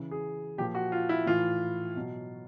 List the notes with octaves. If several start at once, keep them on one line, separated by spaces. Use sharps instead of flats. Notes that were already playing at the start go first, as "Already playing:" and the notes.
Already playing: C#3 E3
G#4
A#2 F3 G4
F#4
F4
E4
A2 E3 F4
B2 F#3